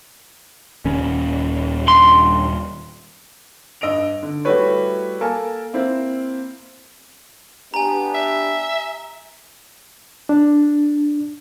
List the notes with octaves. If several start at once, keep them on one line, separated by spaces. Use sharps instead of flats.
D#1 D#3 C#4
G2 C6
G2 D#5 E6 D7 F7
D3
G3 A3 E4 F#4 B4 C#5
A#3 A4 A#4 G#5 A5
A#3 C4 E4 C5
B3 D4 G4 G#5 A#5
E5
D4